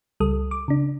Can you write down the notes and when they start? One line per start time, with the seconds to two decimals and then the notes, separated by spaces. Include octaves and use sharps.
0.20 C#2 G3 A4 D#6
0.51 D6
0.68 C#3 D4